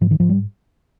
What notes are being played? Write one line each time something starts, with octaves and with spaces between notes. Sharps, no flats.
G#2 F3
D#3
G#2 F3
G3